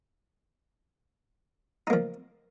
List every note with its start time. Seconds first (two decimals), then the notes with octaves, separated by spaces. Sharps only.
1.87 D#4
1.90 A#3
1.93 F3